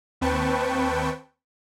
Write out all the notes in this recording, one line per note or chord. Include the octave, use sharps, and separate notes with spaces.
D#2 C4 B4 G5 A5 C#6